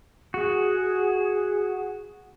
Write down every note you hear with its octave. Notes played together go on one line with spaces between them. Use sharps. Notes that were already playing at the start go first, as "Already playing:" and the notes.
F#4 G#4